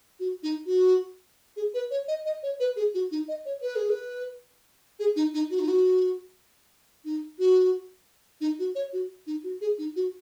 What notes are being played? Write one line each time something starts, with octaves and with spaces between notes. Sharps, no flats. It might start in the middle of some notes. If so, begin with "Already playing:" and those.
F#4
D#4
F#4
G#4
B4
C#5
D#5
D#5
C#5
B4
G#4
F#4
D#4
D#5
C#5
B4
G#4
B4
G#4
D#4
D#4
F#4
D#4
F#4
D#4
F#4
D#4
F#4
C#5
F#4
D#4
F#4
G#4
D#4
F#4